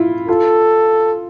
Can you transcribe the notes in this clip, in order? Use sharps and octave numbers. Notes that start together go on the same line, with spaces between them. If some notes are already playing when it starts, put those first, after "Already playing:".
Already playing: E4 F4
F4 A4